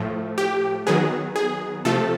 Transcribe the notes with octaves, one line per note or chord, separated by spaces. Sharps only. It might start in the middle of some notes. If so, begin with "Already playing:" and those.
Already playing: A2 F3 A3
G4
D#3 F#3 B3 G#4
G#4
C3 F3 A3 A4